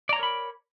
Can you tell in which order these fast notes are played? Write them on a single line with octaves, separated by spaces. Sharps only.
D5 A#5 C#5 A#4 B5